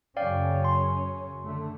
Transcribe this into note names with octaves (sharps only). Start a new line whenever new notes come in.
F#2 C#3 C#4 D5 F5 G5
C6
D3 A3